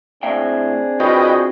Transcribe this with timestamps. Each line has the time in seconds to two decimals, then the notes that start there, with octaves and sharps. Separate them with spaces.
0.23 A2 C4 D4 G#4 E5 G5
1.00 F4 F#4 B4 D#5 G5